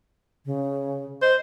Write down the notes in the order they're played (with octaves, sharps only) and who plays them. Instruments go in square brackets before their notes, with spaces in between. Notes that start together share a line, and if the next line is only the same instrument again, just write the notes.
[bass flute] C#3
[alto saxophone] C5 [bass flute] D#5